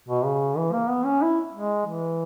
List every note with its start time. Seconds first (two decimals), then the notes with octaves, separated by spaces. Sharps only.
0.08 B2
0.25 C#3
0.57 E3
0.73 A#3
0.90 B3
1.06 C#4
1.22 E4
1.54 G#3
1.86 E3